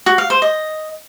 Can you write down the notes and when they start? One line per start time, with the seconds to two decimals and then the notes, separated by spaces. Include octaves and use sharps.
0.06 F#4
0.18 F5
0.30 C5
0.42 D#5